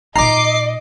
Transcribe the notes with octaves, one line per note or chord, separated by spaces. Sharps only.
A#2 D#4 D#5 A#5 D6 C7